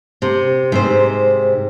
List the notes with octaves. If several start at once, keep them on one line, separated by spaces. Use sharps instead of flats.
C3
G#2 C3 C5